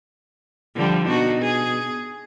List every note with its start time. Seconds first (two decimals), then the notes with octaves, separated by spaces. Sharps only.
0.75 D3 F3 G3
1.07 B2 D4 D#4 F#4
1.41 G#4